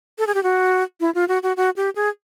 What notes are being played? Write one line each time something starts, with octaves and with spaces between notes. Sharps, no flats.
A4
G#4
G4
F#4
E4
F4
F#4
F#4
F#4
G4
G#4